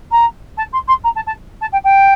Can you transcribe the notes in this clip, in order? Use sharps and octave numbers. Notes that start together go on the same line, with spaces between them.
A#5
A5
C6
C6
A#5
A5
A5
A5
G5
G5